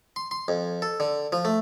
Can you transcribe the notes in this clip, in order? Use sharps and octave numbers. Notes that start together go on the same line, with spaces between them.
C6
C6
F2
A4
D3
F3
A3